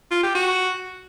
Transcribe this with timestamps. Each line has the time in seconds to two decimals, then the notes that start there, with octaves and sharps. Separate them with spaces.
0.11 F4
0.23 G4
0.35 F#4